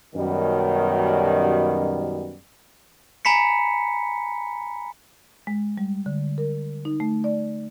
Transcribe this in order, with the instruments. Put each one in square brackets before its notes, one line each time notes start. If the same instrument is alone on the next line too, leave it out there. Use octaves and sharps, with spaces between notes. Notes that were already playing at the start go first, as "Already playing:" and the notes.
[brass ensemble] F#2 B2 D#3 G3
[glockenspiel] G#5 A#5 B5 B6 C#7
[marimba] G#3
G3
D3
A#4
D#4
A3
D5